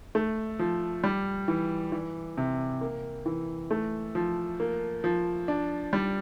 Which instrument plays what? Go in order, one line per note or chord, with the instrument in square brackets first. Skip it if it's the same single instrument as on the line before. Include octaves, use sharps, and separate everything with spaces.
[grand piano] A3
F3
G3
E3
E3
C3
A#3
E3
A3
F3
A#3
F3
D4
G3